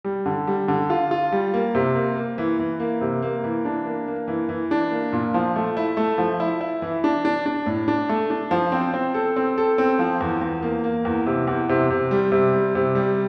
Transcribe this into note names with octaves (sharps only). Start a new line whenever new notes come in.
G3
D3
G3
D3
F4
F4
G3
A#3
C3
A#3
A#3
E3
E3
A#3
C3
A#3
E3
D4
A#3
A#3
E3
E3
D4
A#3
A#2
F3
A3
E4
A3
F3
E4
E4
E3
D4
D4
D4
A2
D4
A3
D4
F3
C4
C4
A4
C4
A4
C4
F3
E2
E2
A#3
A#3
E2
C3
E2
C3
C3
G3
C3
G3
C3
G3